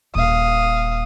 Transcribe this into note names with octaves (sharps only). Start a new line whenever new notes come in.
D#1 F5 D#6